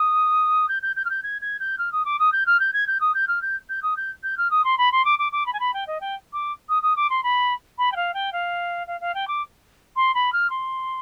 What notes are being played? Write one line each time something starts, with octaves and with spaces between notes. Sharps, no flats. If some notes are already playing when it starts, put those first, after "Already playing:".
Already playing: D#6
G6
G6
G6
F6
G6
G#6
G#6
G6
F6
D#6
D6
D#6
G6
F6
G6
G#6
G6
D#6
G6
F6
G6
G6
D#6
G6
G6
F6
D#6
C6
B5
C6
D6
D6
D6
B5
G#5
B5
G5
D#5
G5
D6
D#6
D#6
D6
C6
B5
B5
G5
F5
G5
F5
F5
F5
G5
D6
C6
B5
F6
C6